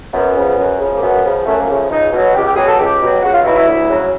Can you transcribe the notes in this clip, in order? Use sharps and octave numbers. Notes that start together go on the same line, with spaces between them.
F#2 B3
C#3 F3
F#2
C#3 F3
A#3
F#2 B3
C#3 F3
F#2 A3
A#3
C#3 F3 A3
C#2 D#4
B2 F#3
C#2 G4
G4
B2 F#3 G#4
A4
C#2 G4
B2 F#3
C#2 F#4
F4
B2 F#3 E4
E4
D2
C#3 F#3